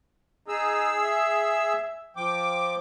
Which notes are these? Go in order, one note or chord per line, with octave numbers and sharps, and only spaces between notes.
D#4 G#4 E6
E5
F3 G5 D6